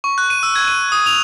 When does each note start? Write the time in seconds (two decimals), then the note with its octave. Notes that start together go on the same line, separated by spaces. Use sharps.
0.04 C#6
0.18 F#6
0.30 D#7
0.43 E6
0.56 G#6
0.67 D#7
0.92 D#6
1.06 F7